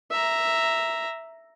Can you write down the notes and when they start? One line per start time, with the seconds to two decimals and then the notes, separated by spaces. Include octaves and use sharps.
0.11 E5 A#5